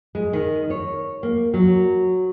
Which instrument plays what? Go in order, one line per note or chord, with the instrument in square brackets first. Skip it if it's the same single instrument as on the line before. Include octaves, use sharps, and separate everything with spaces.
[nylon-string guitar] G#3
D#3
C#5
A#3
F#3